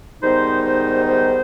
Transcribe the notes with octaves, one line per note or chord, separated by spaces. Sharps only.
G#2 D#3 G3 B3 D#4 C5
C5
C5